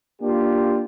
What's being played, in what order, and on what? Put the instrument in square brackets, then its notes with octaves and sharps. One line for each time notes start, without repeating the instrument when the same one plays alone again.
[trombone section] A#3 D4 F4 G4